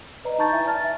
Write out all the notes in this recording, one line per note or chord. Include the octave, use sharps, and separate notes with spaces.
B4 D5 D#5 A#5
D#4 A5 A#5 C#6 G6 A6
E4 E5 G#5
D5 A5 F6 A6
E5